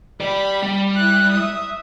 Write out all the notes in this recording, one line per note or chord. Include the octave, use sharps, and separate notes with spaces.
G4 D5 B5
G3
E4 F#6
E5 D#6